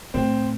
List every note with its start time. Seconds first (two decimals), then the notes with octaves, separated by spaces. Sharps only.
0.14 A2 C4